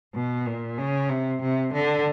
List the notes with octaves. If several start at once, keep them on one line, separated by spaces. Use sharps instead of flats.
B2
A#2
C#3
C3
C3
D3